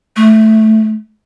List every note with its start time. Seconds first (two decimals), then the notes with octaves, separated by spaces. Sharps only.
0.17 A3